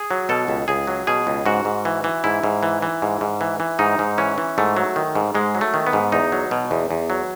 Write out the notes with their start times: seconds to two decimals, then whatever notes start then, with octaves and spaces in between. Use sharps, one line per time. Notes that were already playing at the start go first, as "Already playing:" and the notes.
Already playing: G#4
0.11 F#3
0.29 B2 A4
0.48 C#2
0.68 C#2 G#4
0.87 F#3
1.07 B2 G#4
1.27 C#2
1.46 G#2 F#4
1.65 G#2
1.85 E3
2.04 E3
2.24 G#2 E4
2.43 G#2
2.63 E3
2.82 E3
3.02 G#2
3.21 G#2
3.41 E3
3.60 E3
3.79 G#2 D#4
3.99 G#2
4.18 E3 C#4
4.38 E3
4.58 G#2 A3
4.77 F#3
4.96 D#3
5.15 G#2
5.35 G#2 G#3
5.55 F#3
5.61 A3
5.74 D#3
5.87 B3
5.93 G#2
6.12 E2 D#4
6.32 F#3
6.51 B2
6.71 E2
6.91 E2
7.10 F#3